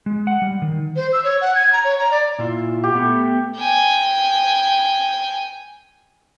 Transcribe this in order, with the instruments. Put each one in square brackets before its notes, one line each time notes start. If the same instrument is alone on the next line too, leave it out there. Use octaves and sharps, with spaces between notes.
[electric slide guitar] G#3
F#5
G3
D#3
[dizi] C5
E6
C#5
F#5
G#6
A#5
C#5
A#5
D5
[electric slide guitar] A#2 E4 F4
[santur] G4
[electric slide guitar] A3 B3
[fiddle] G5 G#5